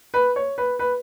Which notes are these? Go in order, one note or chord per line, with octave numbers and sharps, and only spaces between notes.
B4
C#5
B4
B4